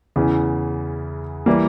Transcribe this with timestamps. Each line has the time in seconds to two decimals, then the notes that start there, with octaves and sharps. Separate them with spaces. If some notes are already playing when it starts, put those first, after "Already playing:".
0.16 E2 C#3 E3
1.46 E3 G3 A#3